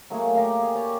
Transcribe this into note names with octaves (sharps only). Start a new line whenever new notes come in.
F#3 A3 A#3 G#4
G4 A#4 F5
G#4
G4 C#5 D5